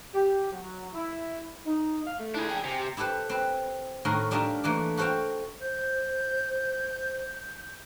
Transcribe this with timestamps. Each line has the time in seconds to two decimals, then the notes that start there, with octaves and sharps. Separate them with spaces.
0.14 G4
0.52 F#3
0.93 E4
1.66 D#4
2.06 F5
2.19 A3
2.34 D4 E4 G#4
2.48 G5 G#5
2.64 C3
2.77 G4
2.97 E4 G4 A4 B4 C5
3.29 C4 B4
4.05 A2 D#3 D#4 F#4 A#4 C6
4.31 G3 D4 D#4 F4 A#4 E5
4.64 E3 A3 A#3 D4
4.97 F#4 A4 C5 F5 G5
5.61 C5 G6